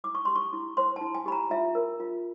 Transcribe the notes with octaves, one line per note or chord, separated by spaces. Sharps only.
E4 D6
C#6
G4 C6
C#6
E4
C5 C6
E4 A5
G#5
G4 B5
A#5
F4 E5
A#4
F4